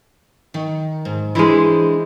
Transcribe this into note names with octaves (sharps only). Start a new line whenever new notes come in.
D#3
G#2
E3 G#3 D4 E4 C5